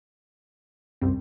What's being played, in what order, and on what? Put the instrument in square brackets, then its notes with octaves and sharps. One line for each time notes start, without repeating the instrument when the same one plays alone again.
[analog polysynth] C2 G3 C4 [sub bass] F#2